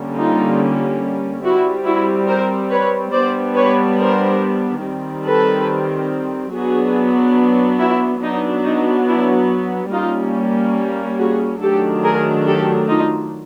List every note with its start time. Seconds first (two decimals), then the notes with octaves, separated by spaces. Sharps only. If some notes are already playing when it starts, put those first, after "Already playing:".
Already playing: D3 G3 A#3 C#4
0.15 D#4 F4
1.43 G3 C4 E4 F#4
1.85 E4 F#4
2.27 A#4 C5
2.70 B4 C#5
3.12 G3 B3 D4 C5 D5
3.55 B4 C#5
3.98 A#4 C5
4.82 D#3 G3 C4
5.25 A4 B4
6.52 F#3 B3 D4 F#4 G#4
7.79 E4 F#4
8.21 F#3 B3 D4 D#4
8.64 D#4
9.06 D4 E4
9.91 G3 A#3 C#4 D#4 F4
11.19 F#4 G#4
11.61 D#3 F#3 A3 D4 G4 A4
12.04 G#4 A#4
12.46 G4 A4
12.88 D#4 F4